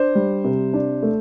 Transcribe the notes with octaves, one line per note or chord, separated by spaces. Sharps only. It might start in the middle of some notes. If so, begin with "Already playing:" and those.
Already playing: D4 C5
G3
C3
D4
A3